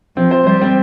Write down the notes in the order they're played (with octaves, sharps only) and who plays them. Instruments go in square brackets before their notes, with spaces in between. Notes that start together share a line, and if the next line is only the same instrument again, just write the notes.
[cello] F3 [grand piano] C4
[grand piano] C5
[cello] G3 [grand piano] C5
[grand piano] C4